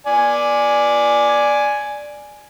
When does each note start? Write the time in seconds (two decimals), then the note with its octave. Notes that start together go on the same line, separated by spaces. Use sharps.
0.07 D5 G#5